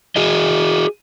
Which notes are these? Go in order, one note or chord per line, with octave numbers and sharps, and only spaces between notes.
F#4 G#4 D#5